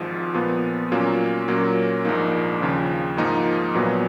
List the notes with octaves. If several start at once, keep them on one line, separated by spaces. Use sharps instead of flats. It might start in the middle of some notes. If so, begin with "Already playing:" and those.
Already playing: G#1 G#2 F3
A#2 F3 B3
A#2 F#3 A#3 C#4 F4
A#2 F#3 A#3 C#4 F4
A#1 G#2 F3 A#3 D#4
D#2 C#3 F3
G#2 F3 A#3 D#4
A#1 A#2 F#3 B3